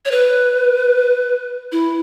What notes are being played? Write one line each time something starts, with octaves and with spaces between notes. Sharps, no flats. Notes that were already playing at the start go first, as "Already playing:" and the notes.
C#5
B4
E4